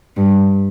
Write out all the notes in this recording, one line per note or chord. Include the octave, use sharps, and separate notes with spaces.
G2